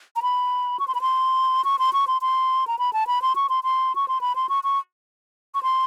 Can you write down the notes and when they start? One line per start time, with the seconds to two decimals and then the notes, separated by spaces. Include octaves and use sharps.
0.16 A#5
0.23 B5
0.79 C#6
0.88 C6
0.95 B5
1.01 C6
1.65 C#6
1.79 C6
1.93 C#6
2.08 C6
2.21 C6
2.67 A#5
2.79 B5
2.93 A5
3.07 B5
3.22 C6
3.36 C#6
3.49 C6
3.64 C6
3.95 C#6
4.08 C6
4.21 B5
4.36 C6
4.49 C#6
4.64 C#6
5.55 C#6
5.63 C6